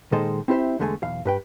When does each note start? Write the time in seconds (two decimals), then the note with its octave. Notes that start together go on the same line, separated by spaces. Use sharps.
0.12 A#2 D#3 G#3 A4 C5 D#5
0.48 C4 E4 G4 C5 E5
0.79 E2 D3 G#3 A3 C5 G#5
1.02 B1 E2 F5
1.25 G2 B4 G5